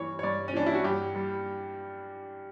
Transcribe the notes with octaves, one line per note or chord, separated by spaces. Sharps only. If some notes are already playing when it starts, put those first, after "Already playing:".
Already playing: G2 E3 C#5
C#5
G2 D5
C#4
E3 D4
E4
F#4
G2 G4
G3